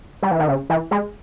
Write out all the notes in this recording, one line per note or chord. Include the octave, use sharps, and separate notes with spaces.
G3
E3
D#3
C#3
E3
G#3